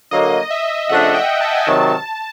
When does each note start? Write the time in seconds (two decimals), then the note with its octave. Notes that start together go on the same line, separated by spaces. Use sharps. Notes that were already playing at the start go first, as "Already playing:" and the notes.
0.11 D3 F#3 A#3 D#5
0.50 E5
0.89 C#3 F3 A3 D4 F#5
1.14 G5
1.41 A5
1.55 G#5
1.67 C3 D#3 F#3 A5